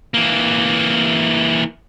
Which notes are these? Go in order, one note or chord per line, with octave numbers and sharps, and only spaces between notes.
E3 A#3